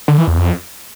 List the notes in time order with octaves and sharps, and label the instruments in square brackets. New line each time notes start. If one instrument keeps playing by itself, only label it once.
[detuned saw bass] D3
E3
E2
F2